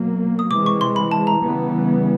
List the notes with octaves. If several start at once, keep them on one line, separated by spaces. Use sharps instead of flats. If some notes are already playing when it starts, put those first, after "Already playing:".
Already playing: B2 F#3 A#3
D#6
C3 E3 G#3 D6
C#6
C6
B5
A5
A#5
C#3 E3 G3 B3